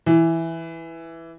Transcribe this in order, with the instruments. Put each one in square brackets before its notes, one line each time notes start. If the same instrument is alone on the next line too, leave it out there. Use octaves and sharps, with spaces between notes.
[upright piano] E3